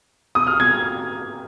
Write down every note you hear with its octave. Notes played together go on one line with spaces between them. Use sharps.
D#6
F6
G#6